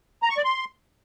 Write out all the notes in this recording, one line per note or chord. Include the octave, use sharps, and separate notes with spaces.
A#5
C#6
D5
C6